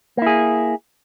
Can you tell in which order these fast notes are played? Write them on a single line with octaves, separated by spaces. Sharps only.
A#3 E4 G#4